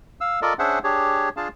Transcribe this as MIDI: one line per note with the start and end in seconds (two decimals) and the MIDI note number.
0.21 0.40 77
0.21 0.40 88
0.42 0.53 65
0.42 0.53 69
0.42 0.53 70
0.42 0.53 74
0.42 0.53 75
0.59 0.79 61
0.59 0.79 62
0.59 0.79 68
0.59 0.79 72
0.59 0.79 76
0.59 0.79 78
0.84 1.29 62
0.84 1.29 67
0.84 1.29 68
0.84 1.29 73
1.37 1.48 62
1.37 1.48 65
1.37 1.48 68
1.37 1.48 77
1.37 1.48 81